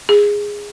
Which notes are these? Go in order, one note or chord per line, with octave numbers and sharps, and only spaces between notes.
G#4